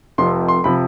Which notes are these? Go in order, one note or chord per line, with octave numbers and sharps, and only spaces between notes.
F1 F2 C3 F3 C6
C6
C3 F3 B5